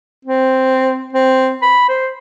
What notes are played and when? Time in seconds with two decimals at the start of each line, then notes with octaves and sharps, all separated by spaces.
0.25 C4
1.13 C4
1.62 B5
1.89 C5